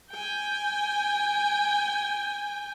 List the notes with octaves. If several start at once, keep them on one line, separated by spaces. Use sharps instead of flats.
G5 G#5